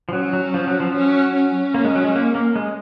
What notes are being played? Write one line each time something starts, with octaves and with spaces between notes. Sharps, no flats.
F3
F#3 C#4
F#3
F3
F#3
F3
F#3 C#4
C#4
A#3
G#3
F#3
G#3
A#3
A#3
G#3